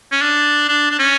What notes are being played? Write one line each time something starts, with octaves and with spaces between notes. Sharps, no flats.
C#4
D4
D4
D4
C#4